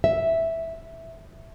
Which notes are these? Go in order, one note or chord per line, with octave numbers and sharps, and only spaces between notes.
E5